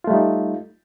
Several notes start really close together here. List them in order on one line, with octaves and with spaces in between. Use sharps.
F4 A3 G3 D#4